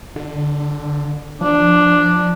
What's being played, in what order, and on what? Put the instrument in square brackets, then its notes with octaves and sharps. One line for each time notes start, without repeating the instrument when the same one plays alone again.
[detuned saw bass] D3
[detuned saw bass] F3 [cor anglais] D4